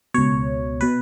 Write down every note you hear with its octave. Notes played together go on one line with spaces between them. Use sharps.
C#2 B2 C#5
B2 B4